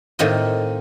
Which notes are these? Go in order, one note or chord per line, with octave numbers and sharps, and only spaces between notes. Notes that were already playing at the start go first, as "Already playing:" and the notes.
A2 D#3 A#3 C4 F4 D#5